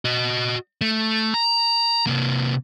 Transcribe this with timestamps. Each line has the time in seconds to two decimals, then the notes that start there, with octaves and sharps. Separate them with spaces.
0.05 F#4 D#5
0.81 A3
1.34 A#5
2.07 C3 A#3